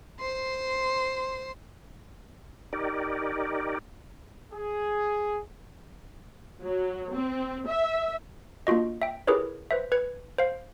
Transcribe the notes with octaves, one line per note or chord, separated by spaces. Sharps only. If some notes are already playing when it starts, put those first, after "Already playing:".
C5 C6
D#4 G4 A#4 D5
G#4
F#3
C4
E5
A#3 D4 F4 F#4 D#5
E5 G5
E4 G4 G#4 A#4 B4 C#5
B4 C5 E5
B4 G#6 C#7
C5 F5